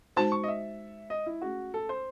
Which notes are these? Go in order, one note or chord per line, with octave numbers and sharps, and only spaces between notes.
G#3 D#4 F#4 C5 A5
C#6
D#5
E5
D#5
E4
A3 C#4 F#4 G#4
A4
C5